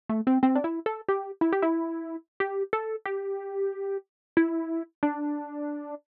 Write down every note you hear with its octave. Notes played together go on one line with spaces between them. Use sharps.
A3
C4
C4
D4
E4
A4
G4
E4
G4
E4
G4
A4
G4
E4
D4